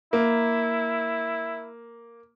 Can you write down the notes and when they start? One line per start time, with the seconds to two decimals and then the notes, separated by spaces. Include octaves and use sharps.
0.13 A#3 E4